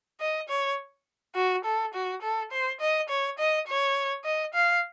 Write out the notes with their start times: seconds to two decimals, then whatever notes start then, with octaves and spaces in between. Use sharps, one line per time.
0.20 D#5
0.48 C#5
1.35 F#4
1.65 A4
1.94 F#4
2.22 A4
2.52 C5
2.80 D#5
3.09 C#5
3.38 D#5
3.68 C#5
4.25 D#5
4.54 F5